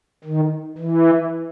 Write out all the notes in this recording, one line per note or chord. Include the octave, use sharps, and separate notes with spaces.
D#3
E3